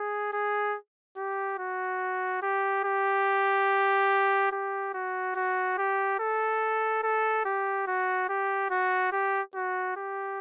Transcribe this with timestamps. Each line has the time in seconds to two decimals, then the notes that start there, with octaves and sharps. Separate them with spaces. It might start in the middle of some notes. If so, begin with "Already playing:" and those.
Already playing: G#4
0.33 G#4
1.17 G4
1.58 F#4
2.42 G4
2.84 G4
4.52 G4
4.94 F#4
5.36 F#4
5.78 G4
6.20 A4
7.03 A4
7.45 G4
7.87 F#4
8.29 G4
8.70 F#4
9.12 G4
9.55 F#4
9.97 G4